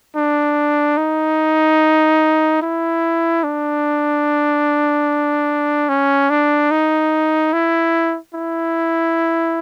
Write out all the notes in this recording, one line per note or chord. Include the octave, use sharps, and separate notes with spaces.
D4
D#4
E4
D4
C#4
D4
D#4
E4
E4